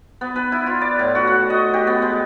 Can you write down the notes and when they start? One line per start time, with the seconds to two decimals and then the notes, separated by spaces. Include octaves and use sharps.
0.21 B3
0.36 B4
0.52 E4
0.66 F4
0.81 D5
0.99 A2
1.15 F#4
1.27 F#5
1.50 D#5
1.74 G4
1.87 B3
2.02 G#3